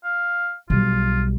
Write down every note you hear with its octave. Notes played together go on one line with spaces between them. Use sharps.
F5
B1 G3 F4